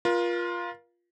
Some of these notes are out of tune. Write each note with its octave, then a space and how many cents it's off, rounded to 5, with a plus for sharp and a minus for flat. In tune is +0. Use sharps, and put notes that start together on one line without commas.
F4 +0 A#4 +40